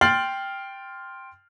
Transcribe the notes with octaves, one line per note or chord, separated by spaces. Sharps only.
G5 C6 F6 A6 C7 F#7